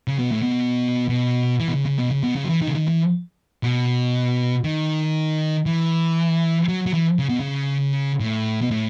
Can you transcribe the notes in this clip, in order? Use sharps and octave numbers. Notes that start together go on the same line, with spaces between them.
C#3
B2
A2
B2
B2
E3
B2
C#3
C#3
B2
C#3
B2
C#3
F#3
E3
D#3
C#3
D#3
E3
B2
D#3
E3
F#3
F#3
E3
C#3
B2
C#3
A2
B2
A2